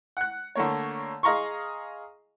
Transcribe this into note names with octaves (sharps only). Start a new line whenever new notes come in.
F#5 F#6
D3 A3 A#3 C#5
G#4 D#5 F5 A#5 C6 C#6